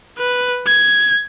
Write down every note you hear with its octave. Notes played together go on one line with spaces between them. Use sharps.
B4
G#6